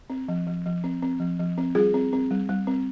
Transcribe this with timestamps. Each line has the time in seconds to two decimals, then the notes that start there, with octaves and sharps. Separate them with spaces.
0.10 C4
0.28 F3
0.47 F3
0.66 F3
0.84 C4
1.02 C4
1.20 F3
1.39 F3
1.58 C4
1.75 G3 F4 G#4
1.94 C4
2.13 C4
2.31 G3
2.49 G3
2.67 C4